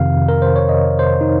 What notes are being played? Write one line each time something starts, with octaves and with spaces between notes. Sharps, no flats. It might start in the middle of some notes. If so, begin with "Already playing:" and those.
Already playing: F2 C3 D#3 F5
A#4
C5
C#5
D#5
C5
D#4